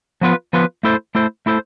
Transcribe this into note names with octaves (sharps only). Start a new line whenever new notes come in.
F3 B3 F4 B4
F3 B3 F4 B4
A3 E4 A4 C5
A3 E4 A4 C5
A3 E4 A4 C5